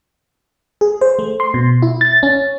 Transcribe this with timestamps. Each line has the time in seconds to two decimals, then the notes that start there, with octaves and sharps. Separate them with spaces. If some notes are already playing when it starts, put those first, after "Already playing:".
0.81 G#4
1.01 C5
1.19 A3
1.40 C6
1.54 B2
1.82 E4
2.01 A6
2.23 C#4